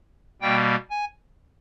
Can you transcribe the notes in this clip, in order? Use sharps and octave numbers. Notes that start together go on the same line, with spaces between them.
B2 G3 A#3 G5
G#5